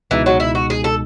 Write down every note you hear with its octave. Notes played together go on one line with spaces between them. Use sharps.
C#2 B2 E3 G#3 D#4
F#3
E4
F#4
G#4
A4